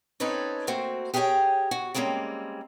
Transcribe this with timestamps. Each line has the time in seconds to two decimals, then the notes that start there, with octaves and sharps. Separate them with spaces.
0.20 C4 C#4 D#4 A4 B4 C#5
0.67 A3 A#3 C4 F#4 C5
1.14 G4 G#4 A#4 C5 C#5 G5
1.71 F#4
1.94 G3 G#3 A#3 C4 C#4